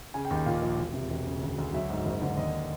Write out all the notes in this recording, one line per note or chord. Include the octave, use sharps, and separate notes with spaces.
C#3 G#5
G5
D#2
G5
A#2 F5
A#1
E1
C3
E1
C#3
D2
D2
F#3 E5
G#2
F#1
D3
D#2 D#5